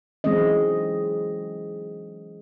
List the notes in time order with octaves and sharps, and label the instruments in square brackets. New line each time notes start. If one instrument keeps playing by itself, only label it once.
[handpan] E3 F#3 G#3 C4 C#4 D#5